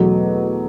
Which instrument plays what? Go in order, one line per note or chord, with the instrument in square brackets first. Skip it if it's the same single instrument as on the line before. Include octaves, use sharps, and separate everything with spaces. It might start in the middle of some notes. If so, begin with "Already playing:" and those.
Already playing: [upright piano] E2 B2 F#3 [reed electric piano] A3 A4